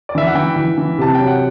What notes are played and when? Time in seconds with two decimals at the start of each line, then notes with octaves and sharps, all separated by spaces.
0.09 D5
0.15 E3 E5
0.27 F#5
0.35 E3 G5
0.56 E3
0.78 E3
0.98 C3 A5
1.15 F#3 G5
1.27 F#5